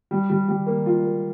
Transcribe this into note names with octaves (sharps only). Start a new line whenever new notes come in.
G3
G3
G3
A#3
F4
A#3